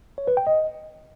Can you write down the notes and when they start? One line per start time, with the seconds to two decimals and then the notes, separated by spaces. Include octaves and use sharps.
0.18 C#5
0.27 B4
0.37 G5
0.47 D#5